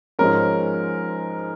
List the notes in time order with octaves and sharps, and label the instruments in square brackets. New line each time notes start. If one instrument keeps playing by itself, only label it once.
[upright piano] G#2 F3 G#3 C#4 A#4